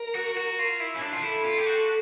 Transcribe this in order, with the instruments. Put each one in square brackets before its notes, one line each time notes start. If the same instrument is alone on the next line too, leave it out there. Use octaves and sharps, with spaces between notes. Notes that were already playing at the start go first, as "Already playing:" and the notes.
Already playing: [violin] A#4
[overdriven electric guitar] F#4
F#4
F4
E4
C#4
D4
F4
[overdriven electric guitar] E4 [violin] A4
[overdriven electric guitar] F4
G4
F#4